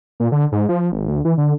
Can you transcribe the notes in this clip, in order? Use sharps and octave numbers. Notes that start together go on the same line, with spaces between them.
A#2
D3
G#2
F3
G#1
D2
E3
D3